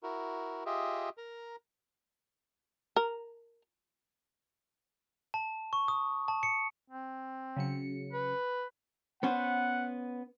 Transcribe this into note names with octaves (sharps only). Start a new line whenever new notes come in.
E4 F#4 A#4
F4 G4 G#4 D#5 E5
A#4 A#5
A#4
A5
C#6
D#6
A5
C#7
C4
C#3 F#3 C#7
B4
B3 C#4 C5 F#5